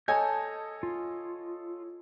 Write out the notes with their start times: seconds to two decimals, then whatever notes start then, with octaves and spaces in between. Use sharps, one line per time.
0.08 A4 C#5 D#5 G#5 A5 G6
0.83 F4